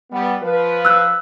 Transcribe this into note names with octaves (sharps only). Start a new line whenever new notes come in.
G3 B3
F3 B4
E6 F#6